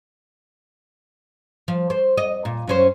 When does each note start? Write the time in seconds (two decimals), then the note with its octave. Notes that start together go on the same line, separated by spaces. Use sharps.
1.68 F3
1.90 C5
2.18 D#5
2.45 A#2
2.67 F#2 C#4 C5